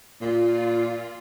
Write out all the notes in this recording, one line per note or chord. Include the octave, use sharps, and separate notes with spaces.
A#2 F4